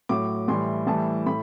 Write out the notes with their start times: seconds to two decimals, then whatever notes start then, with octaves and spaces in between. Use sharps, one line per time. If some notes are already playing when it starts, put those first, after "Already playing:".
0.09 A2 F#3 D6
0.48 A2 E3 G3 C6
0.87 A2 E3 G3 A5
1.26 A2 B5